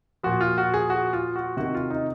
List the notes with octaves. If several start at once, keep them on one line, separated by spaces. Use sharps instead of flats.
A#2 F3 F#4
F4
F#4
G#4
F#4
F4
F#4
C3 D#3 F#4
F4
D#4